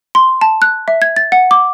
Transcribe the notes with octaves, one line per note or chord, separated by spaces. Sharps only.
C6
A5
F#6
E5
G#6
A6
F#5
D6